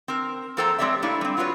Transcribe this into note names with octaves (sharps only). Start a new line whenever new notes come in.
C4 A#4
F2 A#3 A4 C5 G5 A#5
G#3 C4 G4 C#5 D5 E5
A3 A#3 D4 E4
G3 C4
D4 F4 F#4 G#4 B4 C#5